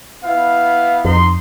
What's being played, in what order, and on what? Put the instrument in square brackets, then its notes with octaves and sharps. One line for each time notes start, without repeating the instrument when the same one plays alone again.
[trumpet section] B3 E4 F5
[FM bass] F2 [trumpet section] D#4 C6